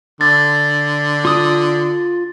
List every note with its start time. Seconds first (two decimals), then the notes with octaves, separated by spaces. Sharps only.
0.21 D3 A6
1.25 F4 D#6